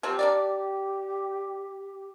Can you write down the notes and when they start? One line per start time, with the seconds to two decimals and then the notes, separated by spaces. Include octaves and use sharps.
0.03 F3 F#3 C4 G4
0.19 D4 A#4 D5